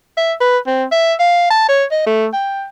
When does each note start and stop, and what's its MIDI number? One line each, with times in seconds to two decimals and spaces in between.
0.17 0.34 76
0.40 0.58 71
0.67 0.84 60
0.92 1.14 76
1.19 1.49 77
1.50 1.67 81
1.69 1.84 73
1.91 2.03 75
2.06 2.28 57
2.33 2.66 79